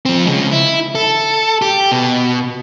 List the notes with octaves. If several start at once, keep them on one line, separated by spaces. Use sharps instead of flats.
F3 C4
C#3 G#3
E4
A4
G4
B2